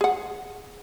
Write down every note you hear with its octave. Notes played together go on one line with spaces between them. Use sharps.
G#4 F#5